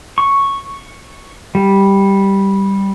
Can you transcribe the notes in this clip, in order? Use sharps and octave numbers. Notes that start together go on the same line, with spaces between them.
C#6
G3